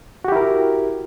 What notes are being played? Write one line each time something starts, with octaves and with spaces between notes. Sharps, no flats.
E4 F#4 G4 A#4